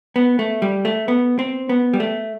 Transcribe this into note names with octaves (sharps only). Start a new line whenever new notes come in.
B3
A3
G3
A3
B3
C4
B3
G3
A3